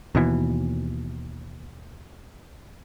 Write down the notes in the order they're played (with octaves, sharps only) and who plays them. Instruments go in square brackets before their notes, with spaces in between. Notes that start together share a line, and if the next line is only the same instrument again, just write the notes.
[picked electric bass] D#2 B2 E3